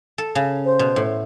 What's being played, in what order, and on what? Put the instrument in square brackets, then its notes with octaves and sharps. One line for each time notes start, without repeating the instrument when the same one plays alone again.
[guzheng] A4
C#3
[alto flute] C5
[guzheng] B2
A2